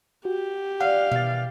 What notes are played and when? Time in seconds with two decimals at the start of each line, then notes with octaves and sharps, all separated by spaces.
0.25 F#4 G4
0.81 F4 D5 F5 F#5
1.11 B2 D#3 E3 G3 A6